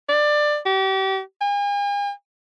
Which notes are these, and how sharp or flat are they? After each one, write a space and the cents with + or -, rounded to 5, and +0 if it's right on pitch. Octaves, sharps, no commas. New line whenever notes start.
D5 +20
G4 -35
G#5 -45